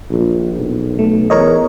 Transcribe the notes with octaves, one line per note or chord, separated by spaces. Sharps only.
A#1
B1
A3
E2 A#4 C#5 D#5